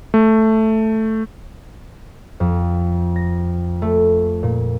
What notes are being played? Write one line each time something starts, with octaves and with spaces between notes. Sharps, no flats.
A3
F2
A#6
A3
A#2